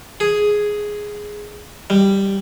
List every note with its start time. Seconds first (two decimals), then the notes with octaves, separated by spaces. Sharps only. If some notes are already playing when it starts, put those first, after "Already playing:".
0.20 G#4
1.90 G3